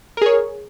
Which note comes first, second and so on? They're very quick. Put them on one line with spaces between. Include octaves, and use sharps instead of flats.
A#4 G#4 C#5